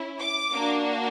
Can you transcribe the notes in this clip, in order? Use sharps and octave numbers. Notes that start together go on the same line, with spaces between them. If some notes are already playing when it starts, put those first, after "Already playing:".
Already playing: C#4 E4
D6
A#3 D4 F#4